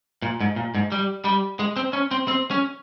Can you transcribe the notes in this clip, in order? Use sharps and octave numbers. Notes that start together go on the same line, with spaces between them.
A#2
G#2
A#2
G#2
G3
G3
G#3
C4
C#4
C4
C4
C#4